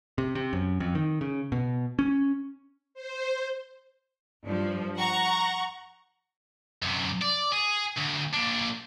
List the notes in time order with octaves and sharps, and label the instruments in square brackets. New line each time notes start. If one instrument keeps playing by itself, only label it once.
[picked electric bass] C3
C3
F#2
F2
D#3
C#3
B2
C#4
[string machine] C5
[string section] G2 F3
F#5 A#5 C#6
[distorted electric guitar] F#2 C3
D5
G#4
D2
A#2 D4